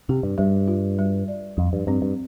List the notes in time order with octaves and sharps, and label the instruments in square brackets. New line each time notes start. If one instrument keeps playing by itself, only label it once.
[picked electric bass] C3 [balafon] G4
[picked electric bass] G2
[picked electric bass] G2 [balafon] G3
[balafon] F4
G3
D5
[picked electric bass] F2 [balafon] F3
[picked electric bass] G2
[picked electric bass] G2 [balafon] C4
[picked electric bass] G2